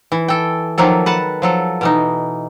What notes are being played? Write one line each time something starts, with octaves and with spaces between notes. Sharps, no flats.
E3
A4 G5
D#3 F3 F#3 A#3 A4
B4 F#5 A5
F3 F#3 A4
B2 E3 D#4